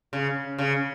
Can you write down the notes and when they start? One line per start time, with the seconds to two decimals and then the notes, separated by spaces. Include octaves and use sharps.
0.13 C#3
0.59 C#3